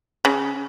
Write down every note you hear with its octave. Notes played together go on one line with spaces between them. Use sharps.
C#3